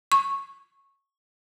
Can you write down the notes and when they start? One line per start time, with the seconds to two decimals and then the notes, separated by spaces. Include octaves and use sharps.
0.12 C#6